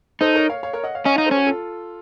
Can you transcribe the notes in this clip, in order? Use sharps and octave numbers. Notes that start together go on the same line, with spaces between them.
D#4 A4 C5
A#4 C#5
C#5 F5
C#5 F5
A#4 C#5
D#5 F#5
C#5 F5
C#4 D#5 F#5
D#4 C#5 F5
A4 C5
C#4
F#4
F4 A4